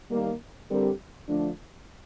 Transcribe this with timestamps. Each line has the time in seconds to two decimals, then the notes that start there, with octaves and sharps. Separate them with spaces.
0.10 D#3 G3 A#3
0.70 D3 G3 C4 G4 A#4
1.28 D3 F3 A3 D4